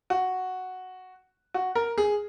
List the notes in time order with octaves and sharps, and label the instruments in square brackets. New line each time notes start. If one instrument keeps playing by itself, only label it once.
[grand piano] F#4
F#4
A#4
G#4